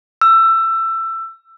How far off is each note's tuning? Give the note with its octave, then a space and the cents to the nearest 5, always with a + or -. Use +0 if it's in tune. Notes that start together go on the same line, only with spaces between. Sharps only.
E6 +20